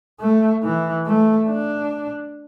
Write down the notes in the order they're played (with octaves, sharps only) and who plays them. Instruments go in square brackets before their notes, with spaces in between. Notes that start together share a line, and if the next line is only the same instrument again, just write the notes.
[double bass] A3
E3
A3
D4